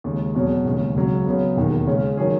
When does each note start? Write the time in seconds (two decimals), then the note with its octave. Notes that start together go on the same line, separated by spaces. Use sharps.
0.04 D#2 C#3 G#3
0.35 E2 B2 F#3 C#4 G#4
0.65 E1 D#2 C#3 G#3
0.96 C#2 C#3 F#3 C#4
1.26 C#3 F#3 B3
1.56 E1 D#2 D#3
1.87 C#3 G#3 C#4
2.17 D#3 F#3 C#4 G#4